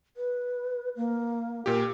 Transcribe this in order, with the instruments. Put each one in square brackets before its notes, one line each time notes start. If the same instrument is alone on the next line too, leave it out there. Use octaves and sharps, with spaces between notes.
[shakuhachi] B4
A#3
[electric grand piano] A#2 G4 [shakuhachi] A#4